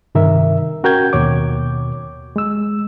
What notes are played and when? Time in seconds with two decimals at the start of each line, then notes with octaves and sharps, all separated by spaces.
0.15 G2 C3 D#3 A#4 E5
0.84 C#4 F#4 A#4 G5 G6 G#6
1.13 D#2 B2 C#5 D6
2.36 G#3 E6